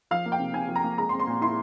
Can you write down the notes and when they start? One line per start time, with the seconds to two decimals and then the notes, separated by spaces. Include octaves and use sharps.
0.11 F3 F5
0.26 A#3
0.32 G5
0.39 C3
0.54 C3 G#5
0.68 F3
0.76 A#5
0.84 A#3
0.98 G#3 A#5
1.09 C6
1.12 C4
1.20 C6
1.27 A#2
1.41 E4 C6